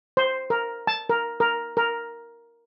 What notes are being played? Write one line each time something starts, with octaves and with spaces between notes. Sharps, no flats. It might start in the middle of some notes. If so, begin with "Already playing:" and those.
C5
A#4
A5
A#4
A#4
A#4